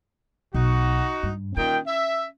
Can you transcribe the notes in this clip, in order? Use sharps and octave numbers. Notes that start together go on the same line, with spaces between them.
B1 D#4 F#4
G2
A#2 D#3 C#4 G5
E5